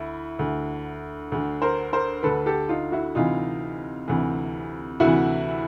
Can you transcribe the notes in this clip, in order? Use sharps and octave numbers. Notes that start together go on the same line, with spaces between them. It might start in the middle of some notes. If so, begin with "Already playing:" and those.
Already playing: D2 E4
D2 D3
D2 D3
A#4 C5
A#4 C5
D2 D3 A4 B4
G4 A4
D#4 F4
E4 F#4
D2 C3 E3 D#4 F4
D2 C3 E3
D2 C3 E3 E4 F#4